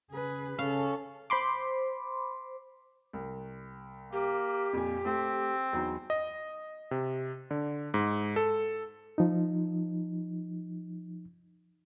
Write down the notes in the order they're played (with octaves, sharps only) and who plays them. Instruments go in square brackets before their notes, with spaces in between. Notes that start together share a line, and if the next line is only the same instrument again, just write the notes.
[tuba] C#3 [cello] G#4 B4
[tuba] C#3 [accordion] C#4 C#6 [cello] A4 [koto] F5
[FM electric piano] C5 B5 C6 D6
[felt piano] C2
[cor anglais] A#3 [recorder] G4
[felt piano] F2 A#2 G#5
[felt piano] A3 [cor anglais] C4
[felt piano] E2 F#3 D#4
[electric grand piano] D#5
C3
D3
G#2
A4
[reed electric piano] F3 D#4